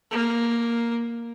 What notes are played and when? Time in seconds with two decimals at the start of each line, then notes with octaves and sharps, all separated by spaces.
0.11 A#3